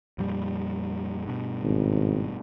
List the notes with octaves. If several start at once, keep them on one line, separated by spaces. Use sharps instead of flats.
F2 A#2 G3
G2 B2
G#1